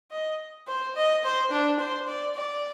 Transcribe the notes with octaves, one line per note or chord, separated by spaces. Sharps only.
D#5
C5
D#5
C5
D4
C5
D5
D5